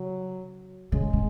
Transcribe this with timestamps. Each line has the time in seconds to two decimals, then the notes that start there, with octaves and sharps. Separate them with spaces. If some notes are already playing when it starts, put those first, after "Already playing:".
Already playing: C#3 F#3
0.92 C#3 G#3
1.13 C#3